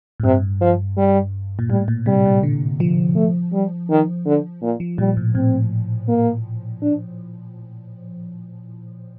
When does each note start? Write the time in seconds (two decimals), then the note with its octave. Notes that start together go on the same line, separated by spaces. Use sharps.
0.20 A2
0.24 G2 C3
0.61 F3
0.97 G3
1.59 A#2
1.70 A2 G3
1.88 A#2
2.06 C3 G3
2.26 A#2
2.43 D3
2.80 F3
3.16 A3
3.53 G3
3.90 D#3
4.26 D3
4.62 A#2
4.80 F3
4.98 A#2 G3
5.17 A2
5.35 A2 C4
6.08 A#3
6.82 D4